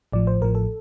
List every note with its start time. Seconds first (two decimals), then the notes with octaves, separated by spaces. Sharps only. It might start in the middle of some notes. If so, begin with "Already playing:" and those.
0.12 A1 A2 F3 D5
0.27 C5
0.41 A1 A2 F3 A#4
0.55 A4